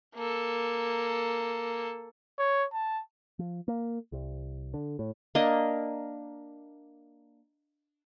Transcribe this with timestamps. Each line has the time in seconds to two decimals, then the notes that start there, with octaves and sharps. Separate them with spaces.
0.15 A#3 A4
2.39 C#5
2.73 A5
3.39 F3
3.68 A#3
4.12 C2
4.74 D3
4.99 A2
5.35 A#3 D4 D#5